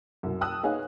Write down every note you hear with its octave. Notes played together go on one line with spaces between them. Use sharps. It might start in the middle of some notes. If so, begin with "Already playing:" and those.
C2 F#2
G5 A5 D#6 E6 F#6
B3 D#4 G#4 C#5 F5